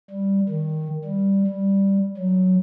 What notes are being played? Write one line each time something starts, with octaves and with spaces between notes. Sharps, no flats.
G3
D#3
G3
G3
F#3